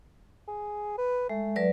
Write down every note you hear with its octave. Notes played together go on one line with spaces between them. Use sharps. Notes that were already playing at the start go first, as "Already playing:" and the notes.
G#4
B4
G#3 A3
F#3 B4 D5